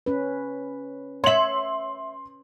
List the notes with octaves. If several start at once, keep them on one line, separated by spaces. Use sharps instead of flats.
C#4 B4
C#5 E5 C6 F#7